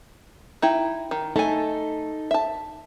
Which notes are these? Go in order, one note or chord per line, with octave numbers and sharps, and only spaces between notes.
D#4 E4 G5
D#3
A3 D#4 A4 G#5
E5 A5